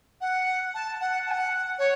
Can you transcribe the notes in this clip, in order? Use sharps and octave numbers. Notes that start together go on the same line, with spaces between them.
F#5
A5
F#5
A5
F#5
C#5